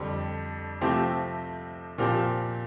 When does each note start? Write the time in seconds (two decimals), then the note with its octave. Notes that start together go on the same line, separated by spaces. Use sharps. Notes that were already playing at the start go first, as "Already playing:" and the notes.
Already playing: F2 D3 G3 C4 G4
0.81 C3 F3 A3 C4 G4
1.98 A#2 F3 C4 G4